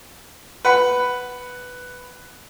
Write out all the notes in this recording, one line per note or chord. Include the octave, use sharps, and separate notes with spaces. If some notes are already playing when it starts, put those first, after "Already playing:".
B4 F#5 B5